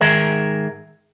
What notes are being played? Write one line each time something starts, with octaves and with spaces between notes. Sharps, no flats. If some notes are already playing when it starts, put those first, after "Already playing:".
G#2 D#3 G#4 A#4 E5